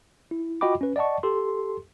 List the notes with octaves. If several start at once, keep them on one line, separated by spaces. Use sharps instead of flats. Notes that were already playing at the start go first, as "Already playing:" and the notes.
E4
F4 F#4 D#5 G5 B5 D6
C#4 B4
D5 D#5 F#5 A5 C#6
G4 A4 C6